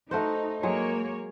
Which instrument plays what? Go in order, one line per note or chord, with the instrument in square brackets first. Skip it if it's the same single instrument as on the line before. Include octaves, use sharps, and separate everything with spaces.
[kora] A3 F#4 C5 [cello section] D#4
[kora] F#3 G#3 [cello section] A#3 C#5